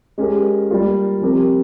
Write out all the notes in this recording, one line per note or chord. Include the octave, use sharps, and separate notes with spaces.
G#3 C#4 G4 A#4
G3 A#3 F4 A#4
F3 C4 G4 A#4